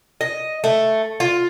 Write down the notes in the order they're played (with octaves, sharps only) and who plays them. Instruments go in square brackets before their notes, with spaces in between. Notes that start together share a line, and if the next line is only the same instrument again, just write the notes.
[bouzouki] D#5
A3
F4